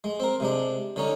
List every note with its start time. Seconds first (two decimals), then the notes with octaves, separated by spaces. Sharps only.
0.04 G#3
0.20 C4 A#4
0.40 C3 G#3 D4
0.96 D3 C#4 D#4